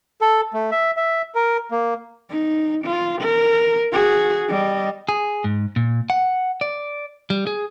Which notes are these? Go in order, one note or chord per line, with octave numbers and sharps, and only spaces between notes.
A4
A3
E5
E5
A#4
A#3
D#4
F4
A#4
F#4 G#4
G3 D#5
G#4
G#2
A#2
F#5
D5
G3
G#4